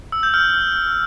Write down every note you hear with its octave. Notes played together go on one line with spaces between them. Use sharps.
E6
G6
F6